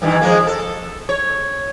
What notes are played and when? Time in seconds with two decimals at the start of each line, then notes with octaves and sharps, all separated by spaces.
0.02 G2 D#3 E3
0.21 F3 G#3 A#3
0.47 A4
1.09 C#5